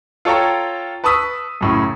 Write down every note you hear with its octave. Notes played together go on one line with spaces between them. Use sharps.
F4 A4 C#5 G5 A#5
B4 A5 C#6 D#6 E6 B6
F#2 A2 C#3